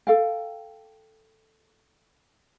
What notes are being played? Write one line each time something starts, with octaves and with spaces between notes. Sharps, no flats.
A4 F5 G5